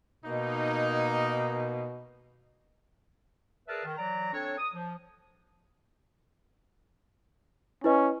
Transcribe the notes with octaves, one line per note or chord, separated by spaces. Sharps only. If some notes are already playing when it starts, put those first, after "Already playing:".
B2 A#3 D#4
G#4 A#4 B4 D5 E5 A5
D#3
E3 F#3 D5 A#5
C4 D4 A4 C#5
D#6
F3
C#4 E4 B4 D#5